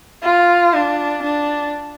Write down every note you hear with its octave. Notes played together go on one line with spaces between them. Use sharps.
F4
D4
D4